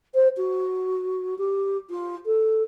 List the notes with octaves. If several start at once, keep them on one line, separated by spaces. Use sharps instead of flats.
C5
F#4
G4
F4
A4